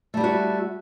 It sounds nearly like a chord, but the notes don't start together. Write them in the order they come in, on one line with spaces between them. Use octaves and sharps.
A3 G3 E4 F#4